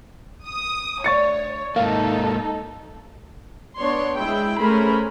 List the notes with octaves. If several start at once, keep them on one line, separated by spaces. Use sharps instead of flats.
D#6
D2 A3 C#5 D5 C#6 A6 C#7
G#2 A#3 D#4 A4 E5 F5
B3 D4 C#5 C6
G#3 E4 G5
A3 C#4 G#4 A#4 C5 B5